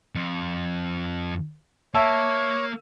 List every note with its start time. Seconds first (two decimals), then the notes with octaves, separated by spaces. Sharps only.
0.15 F2
1.95 A#3 C#5 E5 A5 E6